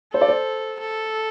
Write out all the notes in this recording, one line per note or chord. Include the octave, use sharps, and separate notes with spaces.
A4 C5
D5
C5
A4